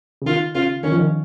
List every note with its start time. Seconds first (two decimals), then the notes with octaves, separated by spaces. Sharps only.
0.22 C#3
0.26 D#3 F4
0.55 C#3 F4
0.83 D#3 C#4
0.92 F3
0.99 D#3